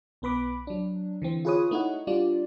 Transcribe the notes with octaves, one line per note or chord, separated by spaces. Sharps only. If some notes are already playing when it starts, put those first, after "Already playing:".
B1 B3 B4 B5 D6
F#3 D4
D3 E3 C4
F4 G#4 B4 C#5 D#6
A3 D#4 E4 F#4 C#5 F#5
G3 D4 F4 D5